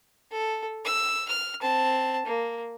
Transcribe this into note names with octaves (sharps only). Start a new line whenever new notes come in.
A4
E6
F6
C4 A5
A#3